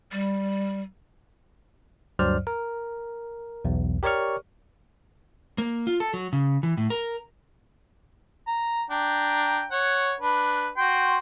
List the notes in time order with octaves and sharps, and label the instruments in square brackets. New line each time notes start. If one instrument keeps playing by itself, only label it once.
[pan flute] G3
[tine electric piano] D2 G2 F#3 C5 D5 F6
A#4
B1 E2
G4 A#4 C#5 D5 C#6 F6
[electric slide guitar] A#3
F4
A4
F#3
C#3
E3
A2
A#4
[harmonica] A#5
D4 G5 A#5
C#5 F#5
D4 B4
F#4 G5 C6